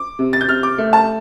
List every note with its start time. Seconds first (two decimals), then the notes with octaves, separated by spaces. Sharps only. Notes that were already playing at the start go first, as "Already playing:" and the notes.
Already playing: D6
0.19 C3
0.33 A6
0.41 G6
0.48 C3 F6
0.63 D6
0.78 A3
0.93 A5